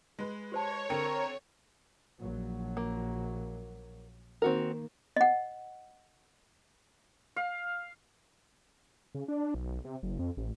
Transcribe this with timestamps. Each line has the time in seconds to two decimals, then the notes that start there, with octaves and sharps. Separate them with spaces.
0.19 G#3 B4
0.52 G4 C5 C#5 A5
0.90 D3 C4 A#4 G5 A#5 C#7
2.19 A#1 F#3
2.77 A#3
4.42 D#3 A#3 C4 F#4 A#4
5.16 D#5 F#5
7.36 F5
9.15 C#3
9.28 D4
9.54 B1
9.84 C3
10.03 F#1
10.19 F2
10.37 A1